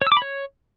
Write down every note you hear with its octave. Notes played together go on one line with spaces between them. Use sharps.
C#5
E6
D6
B5
C#5